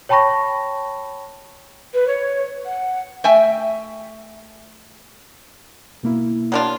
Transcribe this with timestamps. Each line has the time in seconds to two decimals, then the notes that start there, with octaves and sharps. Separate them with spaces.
0.09 C#5 G5 A5 B5 C#6 A#6
1.93 B4
2.07 C#5
2.65 F#5
3.24 A3 E5 G5 G#5
6.03 B2 A#3 E4
6.52 F#3 D4 F4